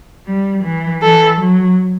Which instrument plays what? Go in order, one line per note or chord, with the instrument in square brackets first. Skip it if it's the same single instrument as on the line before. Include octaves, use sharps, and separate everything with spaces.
[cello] G3
E3
[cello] E3 [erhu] A4
[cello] F#3